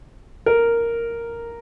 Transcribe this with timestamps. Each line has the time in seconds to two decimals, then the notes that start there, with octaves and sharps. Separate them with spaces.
0.46 A#4